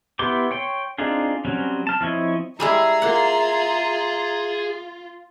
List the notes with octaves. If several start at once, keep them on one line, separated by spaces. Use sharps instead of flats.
B3 E4 G4 C6 D6
C#5 G5 C6
C4 D4 D#4 F4 G#4
F#3 G3 C4 C#4
A5 F6
F3 C4 E4 C#5 D#5
G3 G#3 E4 G#4 E5 A#5
A#3 F4 F#5